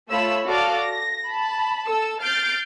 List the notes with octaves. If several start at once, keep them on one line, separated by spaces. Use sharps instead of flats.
A3 F4 C#5 B5 E6
F#4 A4 D5 F5 D6 F6
A#6
A5 B5
A4 E6
F6 G6 A6 C7 D7